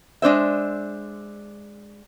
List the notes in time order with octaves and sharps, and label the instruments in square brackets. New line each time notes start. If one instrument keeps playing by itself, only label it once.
[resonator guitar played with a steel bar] G#3 D4 C5 E5